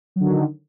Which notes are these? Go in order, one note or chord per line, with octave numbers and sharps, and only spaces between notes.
D3 D#3 F#3